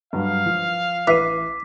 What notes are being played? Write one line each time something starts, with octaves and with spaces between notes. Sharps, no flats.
G2 F#3 F5
F3
A1 E4 B4 E5 D6 B6 C7 D#7